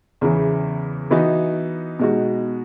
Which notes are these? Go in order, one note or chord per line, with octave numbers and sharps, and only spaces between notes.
E2 C#3 E3
E3 B3 D#4 F#4
B2 G#3 D#4 F#4